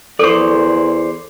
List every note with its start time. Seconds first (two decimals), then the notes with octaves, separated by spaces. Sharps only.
0.19 E2 A4 C5 D5 C#6